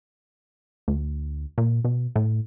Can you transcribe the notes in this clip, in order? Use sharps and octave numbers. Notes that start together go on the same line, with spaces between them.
D2
A#2
B2
A2